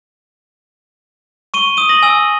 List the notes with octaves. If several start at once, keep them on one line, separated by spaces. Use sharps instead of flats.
C#6 D#7 G7
D#6 D#7
A#6 F#7
G#5 E6